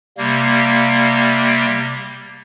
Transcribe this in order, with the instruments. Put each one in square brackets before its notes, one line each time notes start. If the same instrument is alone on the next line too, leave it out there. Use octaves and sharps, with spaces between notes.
[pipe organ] C3 G3 A#3